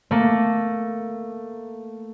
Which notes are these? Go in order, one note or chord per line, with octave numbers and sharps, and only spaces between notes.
A3 A#3